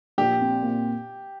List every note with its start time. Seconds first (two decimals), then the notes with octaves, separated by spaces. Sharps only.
0.18 A#1 G4
0.40 C4
0.63 A#2